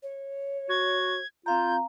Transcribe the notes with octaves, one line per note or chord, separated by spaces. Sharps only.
C#5
F#4 G#6
C4 F4 F5 A#5 G6